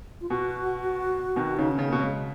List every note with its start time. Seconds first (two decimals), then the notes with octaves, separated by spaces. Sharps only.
0.21 F4
0.30 B2 F#4
1.36 B2 D#3
1.57 C#3 D#4
1.72 C#4
1.78 C#3
1.86 A#3
1.92 B2
2.00 C#3 G#3